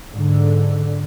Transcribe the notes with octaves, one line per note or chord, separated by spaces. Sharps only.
G#2 D3